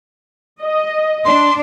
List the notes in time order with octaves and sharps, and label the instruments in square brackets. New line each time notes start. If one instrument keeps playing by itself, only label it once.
[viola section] D#5
[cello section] D4 [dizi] C6